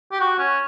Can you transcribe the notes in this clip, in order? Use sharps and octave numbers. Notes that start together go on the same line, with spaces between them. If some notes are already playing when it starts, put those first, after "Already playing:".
G4
F#4
C#4